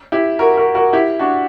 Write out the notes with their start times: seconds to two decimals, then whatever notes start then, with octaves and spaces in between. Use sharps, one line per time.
0.12 E4 G4
0.39 F#4 A#4
0.57 F#4 A#4
0.75 F#4 A#4
0.93 E4 G4
1.19 D4 F#4